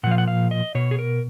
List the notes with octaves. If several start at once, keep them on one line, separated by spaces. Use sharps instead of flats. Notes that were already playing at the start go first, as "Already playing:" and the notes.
A#2 F3 F5 F#5
F#5
F5
D#5
B2 C#5
G#4
A#4